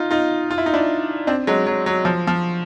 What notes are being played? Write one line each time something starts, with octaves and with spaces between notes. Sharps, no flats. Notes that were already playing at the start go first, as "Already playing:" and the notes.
Already playing: D#4 F4
D#4 F4
F4
E4
D#4
D4 E4
C4 D4
F#3 G#3
F#3
F#3
F3
F3